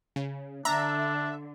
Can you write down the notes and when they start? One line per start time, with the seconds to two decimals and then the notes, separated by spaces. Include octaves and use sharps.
0.16 C#3
0.65 D3 D4 E5 A#5